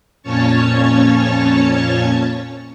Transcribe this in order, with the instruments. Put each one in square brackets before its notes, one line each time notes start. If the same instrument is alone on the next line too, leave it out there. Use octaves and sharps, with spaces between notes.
[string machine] F2 A#2 C#4 C#5 A5 C#6